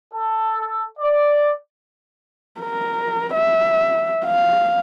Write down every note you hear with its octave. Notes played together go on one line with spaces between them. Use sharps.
A4
D5
A#4
E5
F5